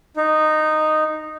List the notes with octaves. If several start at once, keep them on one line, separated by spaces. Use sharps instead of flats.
D#4